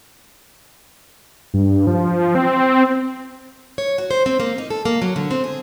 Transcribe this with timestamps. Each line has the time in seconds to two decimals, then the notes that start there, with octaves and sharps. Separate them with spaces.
1.54 G2
1.87 F3
2.35 C4
3.78 C#5
3.98 F#4
4.11 C5
4.26 C4
4.40 A#3
4.58 D#4
4.70 A4
4.85 A#3
5.02 F#3
5.16 D3
5.31 C4
5.44 G#4